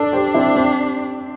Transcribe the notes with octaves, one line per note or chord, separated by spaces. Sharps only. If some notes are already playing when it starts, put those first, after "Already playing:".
Already playing: D4 A4 D5
G4 C5
C4 E4
C4